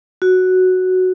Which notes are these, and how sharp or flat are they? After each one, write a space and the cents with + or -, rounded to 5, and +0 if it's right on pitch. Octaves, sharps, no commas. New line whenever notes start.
F#4 +0